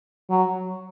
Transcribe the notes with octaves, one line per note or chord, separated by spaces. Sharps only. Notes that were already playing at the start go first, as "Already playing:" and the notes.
F#3